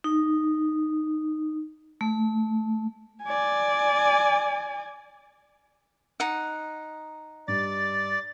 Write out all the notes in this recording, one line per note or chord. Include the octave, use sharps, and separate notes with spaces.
D#4
A3
D5 G#5
D#4 F#5
G2 D5 A6